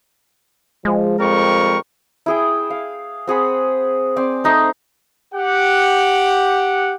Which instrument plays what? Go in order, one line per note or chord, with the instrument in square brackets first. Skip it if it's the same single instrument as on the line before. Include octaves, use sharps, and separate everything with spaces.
[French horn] F3 [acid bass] G#3
[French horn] F2 [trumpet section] G3 A#4 C#6
[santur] E4 G#4 G5
F5
C4 G#4 F#5 B5
C4 D5 G#5
A3 D#4 C5
[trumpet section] G4 F#5